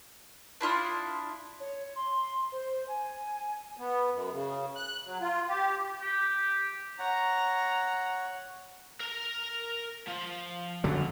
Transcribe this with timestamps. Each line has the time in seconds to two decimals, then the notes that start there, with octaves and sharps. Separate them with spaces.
0.61 D4 E4 F4 D#6
1.60 C#5
1.96 C6
2.52 C5
2.88 G#5
3.77 B3
4.12 F#2
4.32 C#3
4.76 F#6
5.06 F#3
5.21 F4
5.49 G4
6.02 G4
6.99 C#5 F#5 A#5
9.00 A#4 A#5
10.08 F3
10.84 F#2 D3 F#3